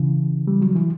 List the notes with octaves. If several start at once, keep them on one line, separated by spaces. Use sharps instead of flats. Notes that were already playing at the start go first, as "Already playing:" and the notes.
Already playing: C#3 E3
G3
F#3
E3